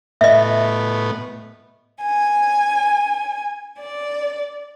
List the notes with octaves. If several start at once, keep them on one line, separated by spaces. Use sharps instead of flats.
A2 B3 D#5 E5
G#5
D5